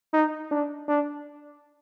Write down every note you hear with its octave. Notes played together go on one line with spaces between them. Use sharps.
D#4
D4
D4